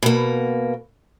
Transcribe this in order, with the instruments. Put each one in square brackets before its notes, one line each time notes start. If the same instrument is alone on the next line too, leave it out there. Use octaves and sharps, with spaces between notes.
[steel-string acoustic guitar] B2 A#3